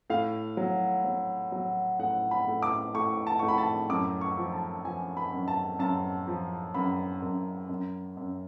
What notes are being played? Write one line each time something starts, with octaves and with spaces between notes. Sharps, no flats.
A2 F5
F#3
F#3
F#3
A2 F#5
B5
A2
D6
A2 C#6
A5
A2 C#6
B5
A5
F#2 D6
C#6
F3
A5
F3 G#5
B5
F#2
A5
F#2 A5
F3
F#2 B5
F#2
F#2
F#2